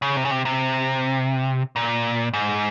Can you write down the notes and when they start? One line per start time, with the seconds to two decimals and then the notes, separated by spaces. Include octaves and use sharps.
0.02 C#3
0.17 C3
0.25 C#3
0.31 C3
0.45 C3
1.76 A#2
2.33 G#2